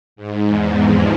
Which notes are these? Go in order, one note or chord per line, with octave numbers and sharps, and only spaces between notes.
G#2
E2
F2